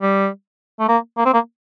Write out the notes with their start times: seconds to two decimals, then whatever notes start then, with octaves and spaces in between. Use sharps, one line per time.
0.02 G3
0.80 A3
0.89 A#3
1.18 A#3
1.26 C4
1.34 A#3